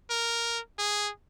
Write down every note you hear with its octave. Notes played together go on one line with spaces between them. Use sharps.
A#4
G#4